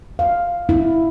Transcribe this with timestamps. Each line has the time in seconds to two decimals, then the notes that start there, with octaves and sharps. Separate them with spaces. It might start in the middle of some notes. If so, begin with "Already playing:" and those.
0.19 F5
0.69 E4